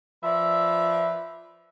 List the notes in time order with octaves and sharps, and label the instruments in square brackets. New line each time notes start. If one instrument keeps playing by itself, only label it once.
[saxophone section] F3 B4 D5 E5